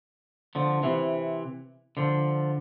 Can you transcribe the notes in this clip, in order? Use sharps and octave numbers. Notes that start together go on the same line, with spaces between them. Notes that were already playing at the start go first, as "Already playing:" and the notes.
D3 F3
C3 E3
D3 F3